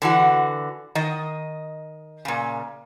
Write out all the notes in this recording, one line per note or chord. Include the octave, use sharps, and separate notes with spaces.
D3 E3 F#4
D#3 D#5
A#2 C#3